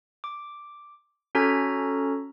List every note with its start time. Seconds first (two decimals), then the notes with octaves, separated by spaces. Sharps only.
0.24 D6
1.35 C#4 F#4 A4 A#5 F6 G#6